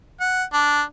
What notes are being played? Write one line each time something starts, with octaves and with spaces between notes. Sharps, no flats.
F#5
D4